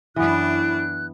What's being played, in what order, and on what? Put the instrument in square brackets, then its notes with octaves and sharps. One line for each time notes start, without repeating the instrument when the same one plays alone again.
[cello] F#2 D4 [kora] E3 B3 [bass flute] E4 [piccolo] F#6